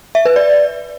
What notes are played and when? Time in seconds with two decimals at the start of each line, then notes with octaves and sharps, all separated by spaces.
0.15 E5
0.25 B4
0.36 D5